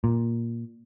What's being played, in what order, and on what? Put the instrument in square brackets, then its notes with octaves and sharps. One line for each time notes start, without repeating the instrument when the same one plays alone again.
[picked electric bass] A#2